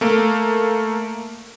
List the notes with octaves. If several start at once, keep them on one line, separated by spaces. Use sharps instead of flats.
A3 A#3